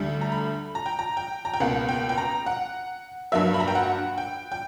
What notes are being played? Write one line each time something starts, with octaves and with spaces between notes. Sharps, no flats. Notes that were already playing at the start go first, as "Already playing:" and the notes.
Already playing: D2 D3 G3
A#5
B5
A#5
G5
A#5
G5
A#5
G5
C#2 B2 A#3 F#5
G5
G5
A#5
F#5
G2 F#3 A#3 E5
B5
A#5
G5
F#5
G5
G5